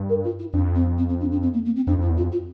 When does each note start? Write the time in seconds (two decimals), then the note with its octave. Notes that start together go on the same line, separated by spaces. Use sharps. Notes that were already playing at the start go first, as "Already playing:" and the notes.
Already playing: G2
0.09 A#4
0.24 F4
0.39 E4
0.53 F2 D4
0.75 C4
0.98 C4
1.09 C4
1.20 D4
1.31 D4
1.42 C4
1.53 A#3
1.65 A#3
1.76 C4
1.87 F2 D4
1.99 F2
2.01 E4
2.09 E2
2.17 F4
2.20 F2
2.32 F4